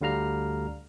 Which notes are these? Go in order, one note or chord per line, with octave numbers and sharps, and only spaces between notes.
D2 D3 G3 F5 A#5 F6